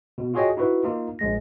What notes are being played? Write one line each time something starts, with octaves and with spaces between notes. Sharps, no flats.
B2
F4 F#4 G#4 C#5 D#5 G5
D#4 E4 F#4 B4
A#3 D#4 F4
A#1 G#3 A#6